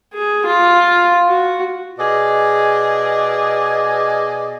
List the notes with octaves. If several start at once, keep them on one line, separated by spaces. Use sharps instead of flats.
G#4
F4
F#4
B2 G#4 D5 D#5